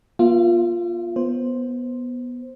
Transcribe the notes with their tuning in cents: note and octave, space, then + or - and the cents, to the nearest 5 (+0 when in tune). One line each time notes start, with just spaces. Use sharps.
A#3 +45 F4 +0 E5 +45
B3 -5 C5 +5